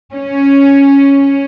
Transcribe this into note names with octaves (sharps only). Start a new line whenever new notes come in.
C#4